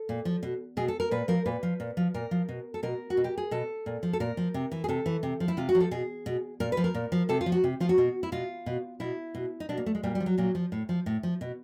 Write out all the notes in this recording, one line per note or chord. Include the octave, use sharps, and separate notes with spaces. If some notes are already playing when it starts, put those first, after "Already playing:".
Already playing: A4
A#2
F3
B2
B2 G#4
A4
A#4
A#2 B4
F3 A#4
A#2 B4
F3
A#2
F3
A#2 A#4
F3
B2
A4
B2 A#4
F#4
B2
G4
G#4
B2 A4
A#2
F3
A4
A#2 A#4
F3
C3
E3
G#4
C3 A4
E3
C3
F3
E4
C3 F4
F#4
F3
A4
B2 G#4
B2
A#2 A#4
B4
F3
A#4
A#2
F3
C3 A4
F4
F3
F#4
C3
F3 F4
F#4
B2
E4
B2 F4
B2
B2 E4
B2
D#4
B2 D4
A#3
A3
G#3
A#2 G3
G3
F3
F#3
A#2 F#3
F3
A2
F3
A2
F3
B2